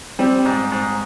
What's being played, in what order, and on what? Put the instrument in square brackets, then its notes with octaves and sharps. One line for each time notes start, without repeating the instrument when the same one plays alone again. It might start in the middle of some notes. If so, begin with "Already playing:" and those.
[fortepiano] G3 [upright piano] C4
[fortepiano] G#2
G#2